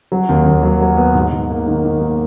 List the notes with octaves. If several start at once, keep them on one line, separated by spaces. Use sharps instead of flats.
F#3
D#2
D#2
F#3
F#3
B3
G#2
G#2
A#3
D#3
D#3
A#3